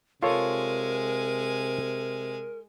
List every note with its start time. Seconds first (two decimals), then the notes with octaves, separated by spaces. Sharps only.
0.23 C3 G#3 F4 A4 A#4 C#5 G#5